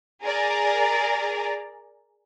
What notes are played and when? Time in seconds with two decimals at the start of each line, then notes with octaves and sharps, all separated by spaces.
0.23 G#4 A#4 D5 A#5